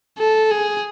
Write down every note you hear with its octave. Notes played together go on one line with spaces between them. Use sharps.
A4
G#4